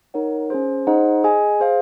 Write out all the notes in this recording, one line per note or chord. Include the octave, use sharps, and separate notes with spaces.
D#4 A#4 C#5 F#5
C#4 G#4 C5
D#4 G#4 C5 D#5 F#5
G#4 D#5 G#5
G#4 C5 F5